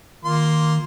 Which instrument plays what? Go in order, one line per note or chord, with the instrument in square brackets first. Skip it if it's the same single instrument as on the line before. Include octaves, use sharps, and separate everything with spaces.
[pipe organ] D#3 [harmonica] A#3 F4 C6